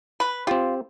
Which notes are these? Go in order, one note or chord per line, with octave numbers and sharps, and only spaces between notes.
B4
C4 F4 G4